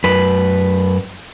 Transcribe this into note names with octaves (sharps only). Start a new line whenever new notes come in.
F#2 B4